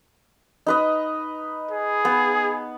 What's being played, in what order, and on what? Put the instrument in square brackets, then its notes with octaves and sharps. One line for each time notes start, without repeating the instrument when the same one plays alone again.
[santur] D#4 B4 D#5
[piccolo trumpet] G#4
[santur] B3